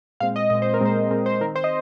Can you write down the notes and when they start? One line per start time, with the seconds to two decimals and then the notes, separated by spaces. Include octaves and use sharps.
0.20 A#2 G#3 C4 F5
0.36 D#5
0.50 A#2 G#3 C4 D#5
0.62 C5
0.74 A#4
0.81 A#2 G#3 C4 C5
1.11 A#2 G#3 C4 A#4
1.26 C5
1.41 D#3 A#4
1.45 C4
1.56 C5
1.64 D#5